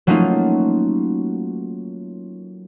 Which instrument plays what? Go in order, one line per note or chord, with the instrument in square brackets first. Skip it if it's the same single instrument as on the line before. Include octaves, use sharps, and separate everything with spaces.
[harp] F#3 A3 A#3 C#4 D#4 F4